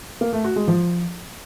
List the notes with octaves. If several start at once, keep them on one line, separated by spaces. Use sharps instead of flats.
A#3
A3
F#4
G#3
F3